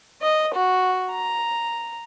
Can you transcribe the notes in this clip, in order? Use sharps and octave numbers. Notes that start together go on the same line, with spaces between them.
D#5
F#4
A#5